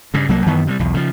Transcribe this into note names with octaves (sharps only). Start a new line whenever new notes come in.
G2 C#3
C2 F#3 A#3
F#2 D#3 E3 B3
C3 F#3 G3
B1 E2
C#3 F3